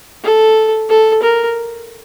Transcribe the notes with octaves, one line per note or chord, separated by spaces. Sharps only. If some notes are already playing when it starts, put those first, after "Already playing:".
A4
A4
A#4